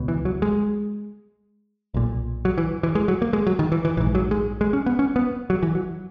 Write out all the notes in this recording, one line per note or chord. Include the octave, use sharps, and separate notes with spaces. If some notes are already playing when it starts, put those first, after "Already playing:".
Already playing: C#2 B2
E3
F#3
G#3
B1 A#2
F#3
E3
E3
G#3
F#3
A#3
G#3
F#3
D#3
E3
E3
A#1 G#2 E3
F#3
G#3
G#3
C#4
B3
C#4
B3
F#3
E3
F#3